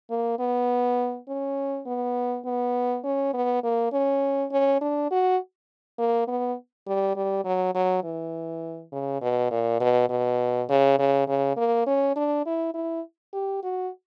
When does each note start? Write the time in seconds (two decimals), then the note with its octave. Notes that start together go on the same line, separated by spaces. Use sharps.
0.10 A#3
0.39 B3
1.28 C#4
1.87 B3
2.45 B3
3.04 C#4
3.34 B3
3.63 A#3
3.92 C#4
4.52 C#4
4.81 D4
5.11 F#4
5.98 A#3
6.28 B3
6.87 G3
7.16 G3
7.45 F#3
7.75 F#3
8.04 E3
8.92 C#3
9.21 B2
9.51 A#2
9.80 B2
10.09 B2
10.69 C#3
10.99 C#3
11.28 C#3
11.57 A#3
11.86 C#4
12.16 D4
12.46 E4
12.74 E4
13.33 G4
13.63 F#4